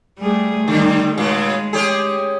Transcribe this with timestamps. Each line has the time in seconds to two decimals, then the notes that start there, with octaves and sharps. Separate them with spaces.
0.19 G3 A3 G#4
0.68 D3 D#3 G3
1.18 A#2 C#3 G#3
1.73 C#4 G4 G#4